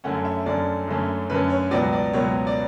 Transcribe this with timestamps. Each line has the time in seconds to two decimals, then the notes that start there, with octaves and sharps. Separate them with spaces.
0.04 F#2 D3 A3 C#4 F#5
0.25 E5
0.46 F#2 D3 A3 C#4 D5
0.87 F#2 D3 A3 C#4
1.30 F#2 D3 A3 C#4 B4
1.50 C#5
1.71 C#2 B2 F#3 B3 D5
1.93 D5
2.13 C#2 B2 F#3 B3 C#5
2.47 D5